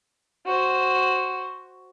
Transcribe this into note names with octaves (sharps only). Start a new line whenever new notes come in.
F#4 C5